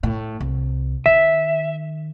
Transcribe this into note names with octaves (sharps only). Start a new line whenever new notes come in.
A2
C2
D#3 E5